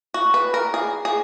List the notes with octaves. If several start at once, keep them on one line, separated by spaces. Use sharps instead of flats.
F#4
B4
A#4
G#4
G#4